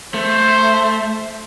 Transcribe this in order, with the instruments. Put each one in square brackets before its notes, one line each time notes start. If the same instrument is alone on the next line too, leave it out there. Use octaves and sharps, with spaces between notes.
[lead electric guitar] A3 [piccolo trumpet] C5